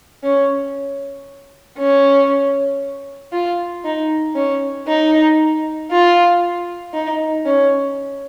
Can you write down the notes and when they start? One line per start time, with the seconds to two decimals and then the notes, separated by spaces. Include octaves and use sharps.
0.24 C#4
1.78 C#4
3.33 F4
3.84 D#4
4.36 C#4
4.87 D#4
5.91 F4
6.94 D#4
7.45 C#4